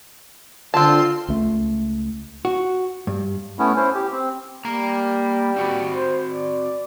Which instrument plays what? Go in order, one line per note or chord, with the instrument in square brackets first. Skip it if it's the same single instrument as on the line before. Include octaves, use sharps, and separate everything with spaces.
[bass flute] D3 [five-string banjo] C4 A5 [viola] F4 C6
[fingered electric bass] C#2 A3
[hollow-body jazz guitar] F#4
G2
[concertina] A3 B3 C#4 E4
C#4 E4 C5
G4
C4
[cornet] G3 [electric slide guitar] A#3 A#5
[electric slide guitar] C4 F#4
[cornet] C5
D5